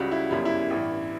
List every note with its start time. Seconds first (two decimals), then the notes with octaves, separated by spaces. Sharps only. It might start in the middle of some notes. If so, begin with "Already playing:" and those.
Already playing: C#2 C#3 G3 F#4
0.12 E4
0.31 G1 F#2 C#3 G3 E4
0.45 E4
0.70 A1 G2 E3